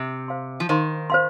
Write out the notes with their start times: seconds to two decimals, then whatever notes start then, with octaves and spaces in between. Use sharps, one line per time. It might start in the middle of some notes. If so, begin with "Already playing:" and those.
Already playing: C3
0.28 C5 F5 C6
0.60 F3
0.69 D#3 C5 F5 C6
1.10 C5 F5 C6